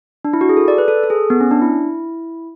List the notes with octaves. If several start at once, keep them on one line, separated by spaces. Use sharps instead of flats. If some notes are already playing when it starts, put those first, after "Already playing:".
D4
E4
F#4
G#4
A4
D5
B4
A4
A4
G#4
B3
C#4
D4
E4